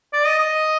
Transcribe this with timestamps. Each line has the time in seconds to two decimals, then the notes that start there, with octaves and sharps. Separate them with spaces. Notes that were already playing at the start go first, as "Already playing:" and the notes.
0.13 D5
0.26 D#5
0.39 D#5